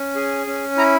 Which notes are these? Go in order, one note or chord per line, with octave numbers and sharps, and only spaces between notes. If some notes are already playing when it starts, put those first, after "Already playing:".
Already playing: C#4
G#4
C#4
E4 A#5